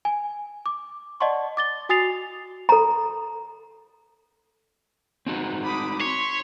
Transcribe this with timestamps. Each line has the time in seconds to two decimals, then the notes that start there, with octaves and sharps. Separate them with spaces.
0.05 G#5
0.66 D6
1.20 D5 D#5 F#5 A5 C6 C#6
1.57 D6 A6 G7
1.89 F#4 G#5 D#6 A6 C7 F7
2.69 A4 A#5
5.27 C4 D#4 F#4
5.64 B5 D6 D#6
6.01 C#5 C6 B6